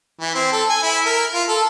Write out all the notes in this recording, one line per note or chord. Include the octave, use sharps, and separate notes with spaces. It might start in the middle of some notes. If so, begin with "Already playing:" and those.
E3
C4
A4
G#5
E4
A#4
F4
A4